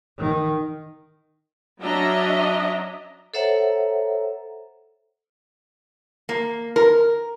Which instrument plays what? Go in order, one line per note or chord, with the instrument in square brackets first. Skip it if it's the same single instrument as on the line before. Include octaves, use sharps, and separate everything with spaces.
[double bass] D#3
[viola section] F#3 C#4 D4 D#5 E5 A#5
[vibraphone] A4 C5 C#5 E5 F#5 A#5
[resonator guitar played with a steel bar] A#3
A#4